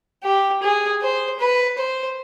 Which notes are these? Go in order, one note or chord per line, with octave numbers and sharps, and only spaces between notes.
G4
G#4
C5
B4
C5